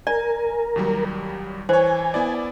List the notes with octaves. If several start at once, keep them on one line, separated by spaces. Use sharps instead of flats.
A#4 D5 G#5
D#2 F#3 G3
E3 C5 C#5 G#5
B3 E4 D5